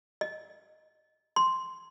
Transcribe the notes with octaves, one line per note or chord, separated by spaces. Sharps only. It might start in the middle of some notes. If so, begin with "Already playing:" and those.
D#5
C6